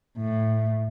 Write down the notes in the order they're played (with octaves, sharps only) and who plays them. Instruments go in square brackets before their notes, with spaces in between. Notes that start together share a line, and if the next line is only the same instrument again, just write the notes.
[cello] A2